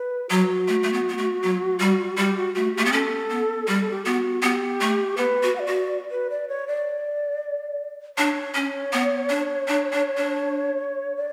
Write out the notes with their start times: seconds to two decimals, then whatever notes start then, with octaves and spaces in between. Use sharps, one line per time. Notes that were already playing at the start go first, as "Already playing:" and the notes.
Already playing: B4
0.30 F#3 F#4
0.68 A3
0.83 A3
0.93 B3
1.09 B3
1.18 A3
1.43 F#3
1.80 G3
2.17 G3 G4
2.37 F#4
2.55 A3 F#4
2.74 A3 G4
2.85 B3
2.92 C#4 A4
3.30 B3
3.68 G3 G4
3.80 A4
3.90 G4
4.05 B3 F#4
4.42 B3 G4
4.81 A3
5.17 B3 B4
5.43 F#4
5.55 F#5
5.59 D5
5.67 F#4
6.11 B4
6.30 D5
6.48 C#5
6.68 D5
8.17 D4 C#5
8.55 C#4
8.93 B3
9.30 D4
9.68 D4
9.92 D4
10.17 D4
11.16 D5